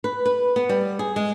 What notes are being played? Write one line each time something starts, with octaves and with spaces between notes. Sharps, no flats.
B4
B4
B3
G3
G#4
G#3